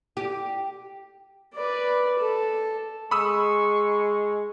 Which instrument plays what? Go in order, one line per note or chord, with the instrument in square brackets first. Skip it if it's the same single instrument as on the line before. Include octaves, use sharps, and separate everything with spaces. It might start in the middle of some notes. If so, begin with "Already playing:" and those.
[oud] G4
[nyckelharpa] B4 D5
A4
[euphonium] G#3 [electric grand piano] B5 D#6 E6 [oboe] C#6